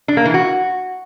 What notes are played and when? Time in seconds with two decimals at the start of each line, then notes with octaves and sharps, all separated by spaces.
0.08 D4
0.17 A#3
0.25 E3
0.34 F#4